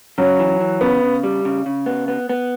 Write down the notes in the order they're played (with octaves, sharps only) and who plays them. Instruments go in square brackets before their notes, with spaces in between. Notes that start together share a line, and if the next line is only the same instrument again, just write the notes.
[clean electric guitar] C#3 [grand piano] F#3
[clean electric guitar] E3
E3
[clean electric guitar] C#3 [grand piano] B3
[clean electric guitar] C#3
G3
C#3
C#3
B3
B3
B3